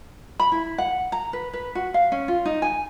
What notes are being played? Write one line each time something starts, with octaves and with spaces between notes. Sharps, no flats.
B5
E4
F#5
A#5
B4
B4
F#4
F5
C#4
F4
D#4
G#5